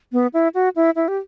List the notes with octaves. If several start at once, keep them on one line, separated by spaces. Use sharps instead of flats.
B3
E4
F#4
E4
E4
G4